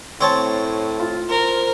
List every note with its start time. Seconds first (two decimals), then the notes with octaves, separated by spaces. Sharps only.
0.21 A2 C4 C#5 A5
1.00 F4
1.29 A#4 C5